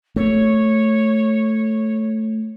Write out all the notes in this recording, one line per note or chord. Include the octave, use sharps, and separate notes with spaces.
A3 C#5